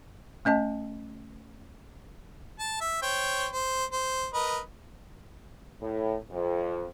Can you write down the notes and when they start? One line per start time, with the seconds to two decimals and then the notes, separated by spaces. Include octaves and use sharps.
0.45 A3 C#4 D#5 A5
2.59 A5
2.81 E5
3.02 C5 C#5 G5
3.52 C5
3.92 C5
4.34 A#4 B4 D#5
5.82 A2
6.30 F2